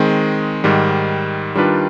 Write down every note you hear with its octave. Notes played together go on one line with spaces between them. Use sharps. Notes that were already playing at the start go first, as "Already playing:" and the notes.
Already playing: D#3 G#3 C4
G#2 D#3 G3
D#3 G3 D4 F4 B4